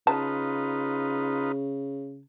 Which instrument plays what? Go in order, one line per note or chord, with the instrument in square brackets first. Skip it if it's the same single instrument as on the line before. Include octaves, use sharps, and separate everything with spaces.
[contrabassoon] C#3 [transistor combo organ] D#4 F4 B4 [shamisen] A5